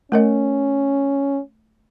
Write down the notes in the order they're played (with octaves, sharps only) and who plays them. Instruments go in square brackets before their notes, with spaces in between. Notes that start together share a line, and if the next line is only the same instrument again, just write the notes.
[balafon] A3 A#4 D#5 [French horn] C#4